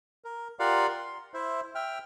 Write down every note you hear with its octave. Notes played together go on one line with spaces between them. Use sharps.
A#4
F4 G4 A#4 D5 F5 F#5
C6
E4 C5 E5
E5 G5 F6